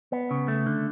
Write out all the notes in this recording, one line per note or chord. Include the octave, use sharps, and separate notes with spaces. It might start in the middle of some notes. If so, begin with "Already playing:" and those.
B3
C#3
A3
D3